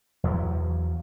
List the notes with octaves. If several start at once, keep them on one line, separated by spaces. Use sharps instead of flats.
E2 F3 F#3